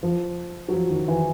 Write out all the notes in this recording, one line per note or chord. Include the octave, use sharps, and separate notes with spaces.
F3
F#3
F3
D#3
E3